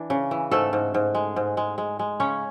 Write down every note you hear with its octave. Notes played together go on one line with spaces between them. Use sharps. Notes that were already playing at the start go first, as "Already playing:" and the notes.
Already playing: E3 D4
C#3
E3
G#2 A3 A4
G#2
G#2
G#3
G#2
G#3
G#3
G#3
C#3 C#4 C#5